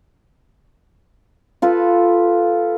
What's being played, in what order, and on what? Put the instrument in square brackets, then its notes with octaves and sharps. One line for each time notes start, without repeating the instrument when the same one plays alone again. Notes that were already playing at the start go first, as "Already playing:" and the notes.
[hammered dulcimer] F4 A4 B4